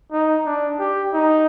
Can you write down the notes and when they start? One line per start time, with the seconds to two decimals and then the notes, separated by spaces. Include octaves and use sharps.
0.12 D#4
0.46 D4
0.79 G4
1.13 D#4